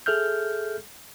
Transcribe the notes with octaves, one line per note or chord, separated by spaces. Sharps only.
G#4 A4 E5 F6 G6